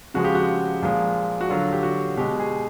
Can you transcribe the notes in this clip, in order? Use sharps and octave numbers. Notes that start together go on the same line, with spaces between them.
C#3 F3 G#3 F#4
G4
F#4
A#2 F3 G#3
F#4
D3 F#3 F4
G4
F#4
B2 G#3 G4
G#4